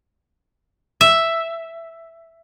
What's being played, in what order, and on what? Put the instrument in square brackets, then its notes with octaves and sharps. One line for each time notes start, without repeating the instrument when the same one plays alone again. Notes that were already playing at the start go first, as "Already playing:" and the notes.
[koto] E5